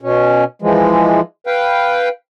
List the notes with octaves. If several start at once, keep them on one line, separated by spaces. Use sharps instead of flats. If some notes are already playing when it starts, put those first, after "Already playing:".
B2 C#4
E3 F3 G#3
B4 F5 G5